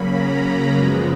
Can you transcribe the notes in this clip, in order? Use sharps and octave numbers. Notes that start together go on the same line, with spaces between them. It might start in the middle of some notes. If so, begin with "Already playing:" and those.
Already playing: C#3 F#3 A#3 C#4 B5
A#5
B5
F#2 C#3 F3 G#3 B3 G#5